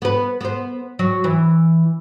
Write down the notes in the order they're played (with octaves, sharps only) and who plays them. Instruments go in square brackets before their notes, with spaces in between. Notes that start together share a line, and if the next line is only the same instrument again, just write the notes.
[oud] B3 B4
B3 C5
F#3
E3